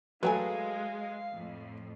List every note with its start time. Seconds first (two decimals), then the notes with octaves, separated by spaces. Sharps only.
0.23 F#3 G#3 A3 B4 F5 G5 G#5
1.33 F2 A2